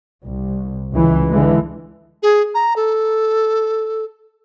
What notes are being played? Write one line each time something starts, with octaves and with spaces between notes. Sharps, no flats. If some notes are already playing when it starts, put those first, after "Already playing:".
C2
C#2 E3
D3 E3 G#3
G#4
A#5
A4